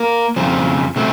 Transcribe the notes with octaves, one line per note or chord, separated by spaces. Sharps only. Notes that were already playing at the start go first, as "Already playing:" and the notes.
Already playing: A#3 A#4
F2 C#3 F3 C4
C#3 A3 C4